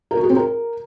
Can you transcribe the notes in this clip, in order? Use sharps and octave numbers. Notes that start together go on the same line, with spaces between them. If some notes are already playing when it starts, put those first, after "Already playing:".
A#4
F#4
G#4
C4
A#4